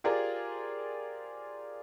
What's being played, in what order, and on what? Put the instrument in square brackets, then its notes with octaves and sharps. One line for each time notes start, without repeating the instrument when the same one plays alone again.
[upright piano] F4 G4 G#4 A#4 C5 D5